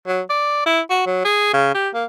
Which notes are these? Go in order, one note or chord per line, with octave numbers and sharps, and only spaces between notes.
F#3
D5
E4
F#4
F#3
G#4
C#3
G4
A#3